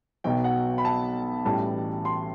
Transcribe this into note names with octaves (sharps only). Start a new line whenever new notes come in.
B1 B2 F#3 G5
F#5
B5
A5
A1 A2 E3 G3 A5
C6